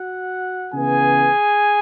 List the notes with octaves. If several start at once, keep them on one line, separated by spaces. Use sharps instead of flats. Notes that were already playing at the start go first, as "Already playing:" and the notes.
Already playing: F#4 F#5
C#3 E3 B3 G#4 G#5